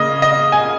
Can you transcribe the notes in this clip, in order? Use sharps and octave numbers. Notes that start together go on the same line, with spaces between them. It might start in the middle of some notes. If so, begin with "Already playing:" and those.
Already playing: C#3 A#3 D#5
D#5
G#5